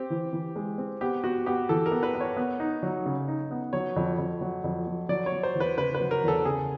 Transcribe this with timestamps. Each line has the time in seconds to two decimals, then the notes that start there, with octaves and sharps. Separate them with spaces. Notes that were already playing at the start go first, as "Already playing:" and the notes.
Already playing: C4 G4
0.10 E3
0.33 E3
0.56 G#3
0.78 C4
1.01 B3 G4
1.24 B3 F#4
1.46 B3 G4
1.69 E3 A4
1.86 A#4
1.92 B3
2.03 B4
2.15 B3
2.20 C#5
2.37 B3
2.60 D#4
2.83 F#3
3.06 C#3
3.28 D#4
3.51 B3
3.73 F#3 C#5
3.96 F2
4.18 F2
4.41 F#3
4.64 F2
4.87 F#3
5.09 F#3 D5
5.26 C#5
5.32 F#3
5.43 C5
5.55 E2
5.60 B4
5.78 C#3 B4
5.95 B4
6.00 F#3
6.11 A#4
6.23 E2 A4
6.45 C#3 G#4